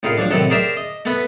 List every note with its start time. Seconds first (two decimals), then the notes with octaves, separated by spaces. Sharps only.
0.03 A2 D#4 F4 G#4 A#4
0.18 F3 F#3 D4
0.30 A2 C3 D#3 F#3 D#4 A4
0.50 G#4 A#4 C5 D5 E5 A#5
0.77 D#5
1.05 A3 B3 B4